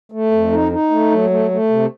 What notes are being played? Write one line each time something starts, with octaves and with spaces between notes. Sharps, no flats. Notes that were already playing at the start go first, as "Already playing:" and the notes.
A3
F2
D#4
D#4
A3
F#3
A3
A3
C3